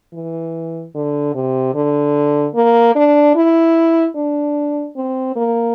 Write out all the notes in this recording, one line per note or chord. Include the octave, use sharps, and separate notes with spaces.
E3
D3
C3
D3
A#3
D4
E4
D4
C4
A#3